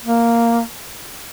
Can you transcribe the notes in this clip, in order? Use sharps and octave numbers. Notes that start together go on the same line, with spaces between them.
A#3